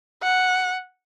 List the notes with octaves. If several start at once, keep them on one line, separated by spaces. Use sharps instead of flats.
F#5